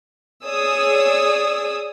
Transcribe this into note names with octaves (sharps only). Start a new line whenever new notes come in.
G#4 C#5 D5 D#6 E6